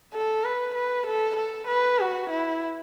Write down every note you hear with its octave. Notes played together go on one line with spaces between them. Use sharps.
A4
B4
B4
A4
A4
B4
F#4
E4